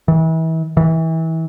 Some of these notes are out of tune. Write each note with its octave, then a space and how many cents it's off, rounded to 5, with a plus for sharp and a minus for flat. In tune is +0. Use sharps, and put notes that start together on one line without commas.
E3 -35
E3 -30